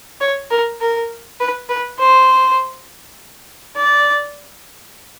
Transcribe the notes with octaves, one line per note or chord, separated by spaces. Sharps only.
C#5
A#4
A#4
B4
B4
C5
D5